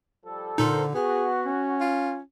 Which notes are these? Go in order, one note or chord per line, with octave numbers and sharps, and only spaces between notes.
F3 G3 A4
A#2 D3 D#4 A4 A#4 C5
B3 F#4 G#4
C#4
F4